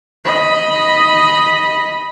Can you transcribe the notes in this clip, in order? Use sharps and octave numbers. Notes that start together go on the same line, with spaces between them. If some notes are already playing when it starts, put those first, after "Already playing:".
D#5 B5